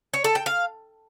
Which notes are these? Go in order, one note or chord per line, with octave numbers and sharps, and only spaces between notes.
C#5
A4
G5
F5